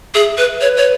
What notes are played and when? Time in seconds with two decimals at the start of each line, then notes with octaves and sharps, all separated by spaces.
0.15 G#4 E5
0.38 B4
0.61 B4 C#5
0.77 C#5